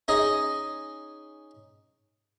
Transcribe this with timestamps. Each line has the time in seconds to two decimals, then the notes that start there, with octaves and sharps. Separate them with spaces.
0.08 C#4 D#4 G#4 D#5